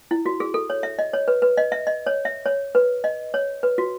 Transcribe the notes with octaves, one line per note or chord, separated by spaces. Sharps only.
E4
F#4
G#4
A4
C#5
E5
D#5
C#5
B4
B4
D#5
E5
D#5
C#5
E5
C#5
B4
D#5
C#5
B4
F#4